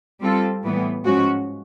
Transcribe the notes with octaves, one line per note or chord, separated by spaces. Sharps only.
G3 C4 F4 A4
A2 E3 G3 B3
G#2 F3 G#3 C#4 F#4